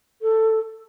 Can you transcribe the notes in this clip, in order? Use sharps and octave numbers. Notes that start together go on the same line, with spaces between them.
A4